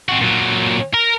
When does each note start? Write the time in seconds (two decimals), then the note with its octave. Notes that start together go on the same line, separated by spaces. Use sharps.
0.09 C4 F#4
0.21 A#2 F#3
0.94 A#4